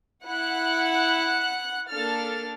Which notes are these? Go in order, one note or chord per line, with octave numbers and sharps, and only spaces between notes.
E4 F#5 F#6
A#3 D4 A4 F6 A6